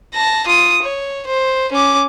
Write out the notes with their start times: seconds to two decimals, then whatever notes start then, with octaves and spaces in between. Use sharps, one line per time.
0.14 A5 A#6
0.47 F4 D#6
0.82 C#5
1.27 C5
1.72 C#4 D6